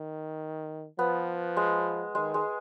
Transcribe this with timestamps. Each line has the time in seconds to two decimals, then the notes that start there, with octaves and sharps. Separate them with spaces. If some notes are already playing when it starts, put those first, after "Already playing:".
Already playing: D#3
0.99 F3 B3
1.57 G#3
2.15 D#3 G#3
2.34 G#3